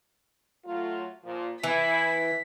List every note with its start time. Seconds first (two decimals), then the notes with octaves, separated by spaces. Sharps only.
0.65 F#3 A3 F4
1.23 A#2 F3
1.63 E3 E4 B6